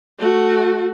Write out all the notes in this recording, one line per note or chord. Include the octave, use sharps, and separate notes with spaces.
A3 F#4